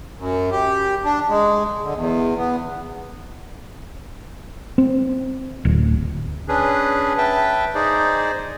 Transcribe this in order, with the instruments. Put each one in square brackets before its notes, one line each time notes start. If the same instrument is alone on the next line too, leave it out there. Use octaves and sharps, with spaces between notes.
[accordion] F#2
G4
D4
G#3
D3
E2
B3
[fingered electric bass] C4
D1
[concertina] C#4 D4 G#4 B4
B4 E5 G5 A5
D#4 G#4 C5 D5